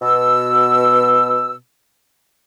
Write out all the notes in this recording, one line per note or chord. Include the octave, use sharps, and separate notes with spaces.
B2 E6